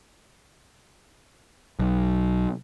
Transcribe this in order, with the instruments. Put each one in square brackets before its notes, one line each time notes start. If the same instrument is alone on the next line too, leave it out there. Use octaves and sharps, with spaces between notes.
[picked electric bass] B1